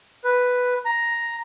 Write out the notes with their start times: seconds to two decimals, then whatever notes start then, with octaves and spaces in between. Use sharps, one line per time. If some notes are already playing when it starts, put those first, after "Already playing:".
0.24 B4
0.85 A#5